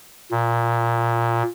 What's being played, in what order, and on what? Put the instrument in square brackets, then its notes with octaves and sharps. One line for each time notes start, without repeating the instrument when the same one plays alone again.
[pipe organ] A#2